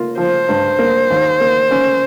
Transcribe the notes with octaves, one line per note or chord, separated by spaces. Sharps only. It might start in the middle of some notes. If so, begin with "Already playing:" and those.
Already playing: A#3 F4
F3 C5
G2
A#3
D#2
A#3
C#4